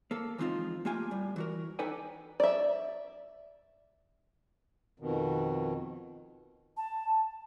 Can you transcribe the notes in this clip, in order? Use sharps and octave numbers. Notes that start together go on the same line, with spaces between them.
A#3 A4
E3 F3 G#3 C4 D#4 F4
A3 A#3 F4 G4 G#5
A2 G3
E3 F#4 A#4
D#4 A4 B4 D5 G5 G#5
D5 E5
F2 B2 D#3
A5